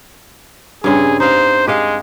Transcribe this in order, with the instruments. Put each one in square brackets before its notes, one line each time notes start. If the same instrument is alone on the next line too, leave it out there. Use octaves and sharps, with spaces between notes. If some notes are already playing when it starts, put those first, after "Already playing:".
[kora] G2 C#3 C4 [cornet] G#4
[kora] D#4 F5 [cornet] C5
[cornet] G#3 [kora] G4 D#5 F5